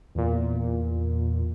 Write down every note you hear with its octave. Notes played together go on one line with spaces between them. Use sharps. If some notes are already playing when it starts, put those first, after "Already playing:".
E2 A#2